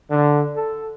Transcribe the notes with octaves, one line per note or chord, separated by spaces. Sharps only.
D3
A4